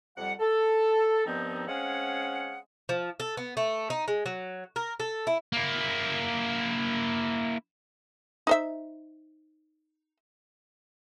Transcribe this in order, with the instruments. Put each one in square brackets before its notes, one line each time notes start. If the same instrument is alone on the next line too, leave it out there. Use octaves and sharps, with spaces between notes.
[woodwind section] F2 C3 G3 F#5
A4
G2 D#3 F3 B3 C4 D#4
G#3 C4 C#4 C#5 F5 F#5
[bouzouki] F3
A4
B3
A3
D#4
G#3
F#3
A#4
A4
E4
[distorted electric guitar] A#3 E4
[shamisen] D#4 C5 E5